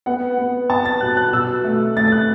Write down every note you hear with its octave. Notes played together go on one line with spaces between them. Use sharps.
B3 F#5
B3
B3 A5
A6
B2 F#6
F#6
B2 E6
A3
A3 A6
A6
F#6